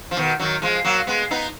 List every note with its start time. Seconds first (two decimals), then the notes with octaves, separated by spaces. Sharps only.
0.11 F3
0.17 B2 D#3
0.40 D#3 F#3
0.62 F3 G#3
0.84 F#3 A#3
1.07 G#3 B3
1.31 B3 D#4